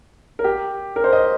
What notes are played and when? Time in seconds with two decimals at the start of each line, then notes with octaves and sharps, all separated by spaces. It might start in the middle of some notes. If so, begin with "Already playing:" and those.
0.39 A#4
0.44 G4
0.96 A#4
1.04 C5
1.13 D#5